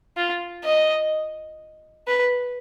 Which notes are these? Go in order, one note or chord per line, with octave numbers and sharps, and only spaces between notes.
F4
D#5
B4